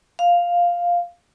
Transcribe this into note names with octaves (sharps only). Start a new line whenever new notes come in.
F5